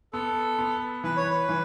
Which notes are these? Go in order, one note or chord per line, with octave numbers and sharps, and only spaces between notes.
B3 A4
B3
E3 B4
C#5
B4
E3